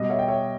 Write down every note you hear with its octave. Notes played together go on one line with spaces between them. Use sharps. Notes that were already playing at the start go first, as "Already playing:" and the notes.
Already playing: B2 G3 D#5
C#5 E5
G5
C#5 E5